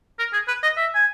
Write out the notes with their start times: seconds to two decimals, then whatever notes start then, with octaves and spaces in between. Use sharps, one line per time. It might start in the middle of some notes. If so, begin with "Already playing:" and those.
0.19 A#4
0.33 G#4
0.48 B4
0.63 D#5
0.77 E5
0.95 G#5